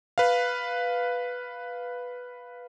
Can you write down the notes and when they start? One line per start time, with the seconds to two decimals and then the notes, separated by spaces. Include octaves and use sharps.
0.18 B4 F5